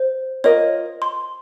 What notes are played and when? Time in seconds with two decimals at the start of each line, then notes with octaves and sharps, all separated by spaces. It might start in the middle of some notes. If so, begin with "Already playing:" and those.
Already playing: C5
0.44 F4 A#4 C#5 D#5
1.02 C6